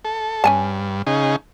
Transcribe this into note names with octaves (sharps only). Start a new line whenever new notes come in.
A4
G2 C#4 G#5 A5
C#3 D#4 G#4